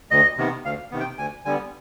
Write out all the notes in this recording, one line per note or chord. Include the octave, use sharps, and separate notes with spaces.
D2 D#5
C3 D#3 B3
D2 F5
C3 D#3 B3
G5
D2 G#5
D3 G3 B3 G#5